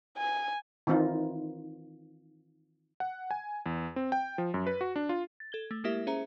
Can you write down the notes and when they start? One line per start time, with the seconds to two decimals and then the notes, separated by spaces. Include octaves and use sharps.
0.17 G#5
0.87 D#3 E3 C4 D#4 F4
3.00 F#5
3.31 G#5
3.66 E2
3.96 C4
4.12 G5
4.38 F3
4.54 F#2
4.66 B4
4.81 F#4
4.96 D4
5.09 F4
5.40 A6
5.52 A4 G#6 G7
5.71 A3
5.84 G#3 A#3 E4 G4 A#4 E5
6.07 C#4 G#4 C5 E5 A#5